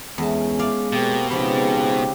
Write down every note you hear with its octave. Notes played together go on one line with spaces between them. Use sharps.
E2 G#3 C#4 A5
D5 F5
B2 A#3 C4 G4
G#2 C#3 F3 C4 G4 B4